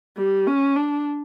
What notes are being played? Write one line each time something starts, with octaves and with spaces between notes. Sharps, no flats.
G3
C#4
D4